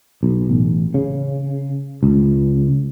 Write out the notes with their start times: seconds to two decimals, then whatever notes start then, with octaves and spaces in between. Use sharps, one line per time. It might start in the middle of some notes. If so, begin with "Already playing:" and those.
0.23 B1
0.49 A1
0.94 C#3
2.03 C#2